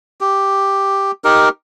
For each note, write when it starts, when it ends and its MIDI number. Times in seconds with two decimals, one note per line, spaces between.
0.21 1.11 67
1.24 1.49 63
1.24 1.49 67
1.24 1.49 70